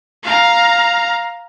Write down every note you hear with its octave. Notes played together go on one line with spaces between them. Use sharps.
F5 A#5